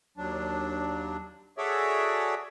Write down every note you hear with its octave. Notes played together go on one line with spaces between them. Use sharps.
D#2 F#3 D4
F#4 G#4 A4 C#5 D5 E5